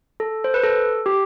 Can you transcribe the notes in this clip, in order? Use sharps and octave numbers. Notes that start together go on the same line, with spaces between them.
A4
C5
B4
A4
G4